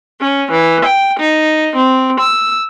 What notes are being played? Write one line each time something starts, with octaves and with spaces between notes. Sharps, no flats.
C#4
E3
G5
D#4
C4
E6